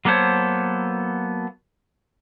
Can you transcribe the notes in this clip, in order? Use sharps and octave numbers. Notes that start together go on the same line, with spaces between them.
F#3 A#3 B3 A4 C5 C#5